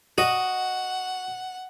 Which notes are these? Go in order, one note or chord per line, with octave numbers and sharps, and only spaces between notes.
F#4 D#5 F#5